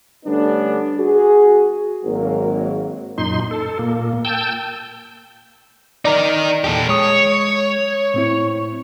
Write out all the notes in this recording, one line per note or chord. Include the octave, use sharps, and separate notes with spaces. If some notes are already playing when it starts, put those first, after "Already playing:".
D3 G3 A3 B3 C#4 D4
F#4 G#4
G#1 F#3 A#3
F#2 A#2 D#4 C6
A4
A#2 A#3
G5 A5 E6 G6
D#4 A#4 D5 A#5
E2 A#2 G4 A4
G#3 C#5 D#6
A2 C4 E4